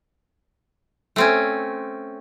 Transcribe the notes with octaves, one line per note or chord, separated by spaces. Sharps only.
A3 C4 C#4